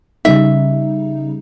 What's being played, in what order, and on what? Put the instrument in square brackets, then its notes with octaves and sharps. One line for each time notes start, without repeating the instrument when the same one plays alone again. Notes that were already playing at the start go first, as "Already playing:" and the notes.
[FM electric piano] C#3 G3 D#4 [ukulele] E5